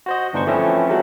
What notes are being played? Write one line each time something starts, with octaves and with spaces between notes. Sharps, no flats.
F#4 C5 D#5
G1 E3 D4 D#4 C5 C#6
E3 F3 A3 C4 C#4 E4
E3 F#3 G#3 A3 F#4